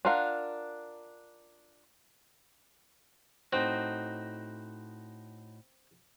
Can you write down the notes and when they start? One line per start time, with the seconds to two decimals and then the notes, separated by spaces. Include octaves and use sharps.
0.05 D4 F4 A#4 F5 F#5
3.53 A2 C4 D#4 F#4